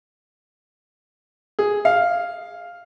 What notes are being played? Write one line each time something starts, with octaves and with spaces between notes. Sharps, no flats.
G#4
F5